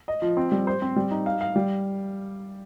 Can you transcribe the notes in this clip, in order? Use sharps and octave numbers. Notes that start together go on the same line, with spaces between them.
D#5
F3
C4
G3
C5
C4
G3
D#4
F5
F5
G3